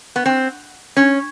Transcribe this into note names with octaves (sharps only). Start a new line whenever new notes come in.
B3
C4
C#4